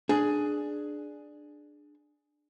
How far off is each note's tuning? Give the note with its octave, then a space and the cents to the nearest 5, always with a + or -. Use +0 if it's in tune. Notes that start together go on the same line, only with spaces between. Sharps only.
D4 +10 G#4 +10